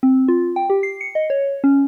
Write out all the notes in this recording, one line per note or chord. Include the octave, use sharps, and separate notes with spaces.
C4
F4
G5
G4
C7
C#7
D#5
C#5
C#4